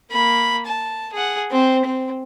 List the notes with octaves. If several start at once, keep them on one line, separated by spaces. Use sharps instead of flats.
A#3 B5
A5
G#4 F#5
C4 C5
C4